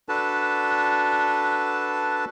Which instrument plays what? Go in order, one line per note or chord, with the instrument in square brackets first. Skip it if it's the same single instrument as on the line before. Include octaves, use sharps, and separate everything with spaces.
[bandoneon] D4 F#4 A4 B4 A5